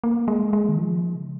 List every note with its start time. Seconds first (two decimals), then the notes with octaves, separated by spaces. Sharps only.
0.04 A#3
0.28 G#3
0.53 G#3
0.69 D#3
0.77 F3
1.15 C#3